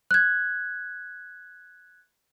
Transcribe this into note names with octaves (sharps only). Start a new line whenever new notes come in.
F#6 G#6